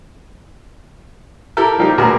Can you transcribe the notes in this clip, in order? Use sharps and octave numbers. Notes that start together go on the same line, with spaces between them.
E4 G4 A4 A#4
F3 G3 A#3 D#4 G4
D2 B2 F#4 G#4 A#4